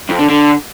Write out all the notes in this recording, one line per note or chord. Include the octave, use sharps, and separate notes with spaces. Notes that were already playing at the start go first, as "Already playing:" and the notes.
F2
D3
D3